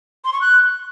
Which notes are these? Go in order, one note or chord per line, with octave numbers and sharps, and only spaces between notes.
C6
C#6
F#6